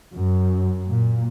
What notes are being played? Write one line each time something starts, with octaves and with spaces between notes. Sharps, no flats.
F#2
A#2